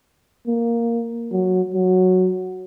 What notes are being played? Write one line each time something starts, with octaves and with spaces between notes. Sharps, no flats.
A#3
F#3
F#3